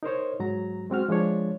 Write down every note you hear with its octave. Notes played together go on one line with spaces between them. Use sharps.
D#4 A#4 C5 C#5
G#2 F#3 A#5
G#3 C4 F#4 F6
F3 G#3 D4 C#5